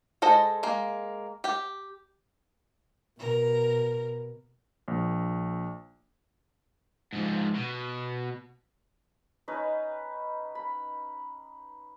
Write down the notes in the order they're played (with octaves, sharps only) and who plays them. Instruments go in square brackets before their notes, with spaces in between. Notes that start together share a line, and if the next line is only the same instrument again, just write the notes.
[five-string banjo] G#3 A4 C5 D#5
G#3 A#3
G4 G5
[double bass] B2 [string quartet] A#4
[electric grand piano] A#1
[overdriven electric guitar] G#2 F3
B2
[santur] C#4 D#4 B4
B5